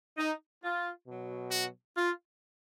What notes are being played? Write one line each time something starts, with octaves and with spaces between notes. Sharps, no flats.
D#4
F4
B2 F#3
F#4
F4